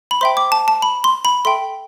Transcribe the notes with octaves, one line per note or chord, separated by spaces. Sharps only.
B5
C5 E5 G5 C6
D6
A5
A5
B5
C6
B5
A4 E5 G5 C6